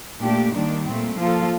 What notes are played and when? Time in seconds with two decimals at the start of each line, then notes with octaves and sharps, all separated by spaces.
0.22 A#2 A3 D4 G4
0.54 D#3 G3 A#3 D4
0.86 A#2 A3 C4
1.18 F3 A#3 F4 A4